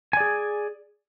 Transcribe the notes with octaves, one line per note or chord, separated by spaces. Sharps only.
G#4 D5 G#5